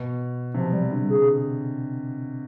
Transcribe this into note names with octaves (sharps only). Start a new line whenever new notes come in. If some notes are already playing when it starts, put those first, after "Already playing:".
Already playing: B2
C3 F3
G3
D3
G#4